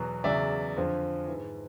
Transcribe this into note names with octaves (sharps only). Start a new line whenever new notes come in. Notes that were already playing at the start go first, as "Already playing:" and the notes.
Already playing: E2 B2 F#3
E2 C#3 F#3 D5 E5
F2 D3 F3
G#2 E3